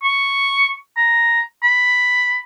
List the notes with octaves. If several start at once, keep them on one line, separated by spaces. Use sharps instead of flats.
C#6
A#5
B5